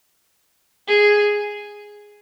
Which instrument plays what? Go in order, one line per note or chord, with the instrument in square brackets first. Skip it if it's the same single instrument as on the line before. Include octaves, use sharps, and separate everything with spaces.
[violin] G#4